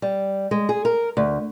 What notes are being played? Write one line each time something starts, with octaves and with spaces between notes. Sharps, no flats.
G3
G#3
G#4
A#4
D2